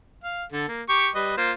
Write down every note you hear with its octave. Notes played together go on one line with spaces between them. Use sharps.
F5
D3 A4
A#3
G4 C#6
G3 B4 D#5
A#3 F4 C5